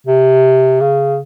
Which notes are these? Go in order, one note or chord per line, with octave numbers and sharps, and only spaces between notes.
C3
C#3